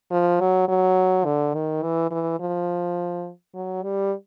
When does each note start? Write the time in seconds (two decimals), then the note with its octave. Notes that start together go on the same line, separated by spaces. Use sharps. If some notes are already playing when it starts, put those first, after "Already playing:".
0.11 F3
0.40 F#3
0.68 F#3
1.25 D3
1.54 D#3
1.83 E3
2.11 E3
2.40 F3
3.54 F#3
3.83 G3